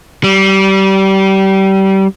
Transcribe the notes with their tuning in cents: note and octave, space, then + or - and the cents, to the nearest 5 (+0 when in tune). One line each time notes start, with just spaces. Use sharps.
G3 -25